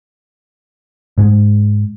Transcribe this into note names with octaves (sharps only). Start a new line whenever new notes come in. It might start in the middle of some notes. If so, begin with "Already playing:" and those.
G#2 G#3